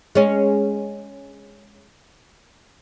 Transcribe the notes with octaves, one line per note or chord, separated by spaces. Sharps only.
G#3 C#4